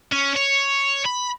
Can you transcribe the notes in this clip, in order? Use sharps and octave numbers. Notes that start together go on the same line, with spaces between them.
C#4
C#5
B5